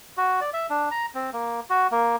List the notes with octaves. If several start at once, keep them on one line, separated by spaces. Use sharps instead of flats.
F#4
D5
E5
D4
A#5
C4
A#3
F#4
A#3